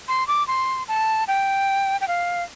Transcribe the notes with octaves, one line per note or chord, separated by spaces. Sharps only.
C6
D6
C6
A5
G5
G5
F5